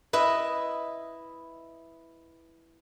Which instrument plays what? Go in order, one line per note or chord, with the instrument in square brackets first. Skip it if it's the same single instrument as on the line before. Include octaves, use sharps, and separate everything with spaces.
[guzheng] E4 B4 D#5